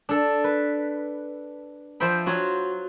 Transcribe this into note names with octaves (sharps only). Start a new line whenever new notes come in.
D4 A4
B4
F3 C5 E5 G5 B5
F#3 F4 F#4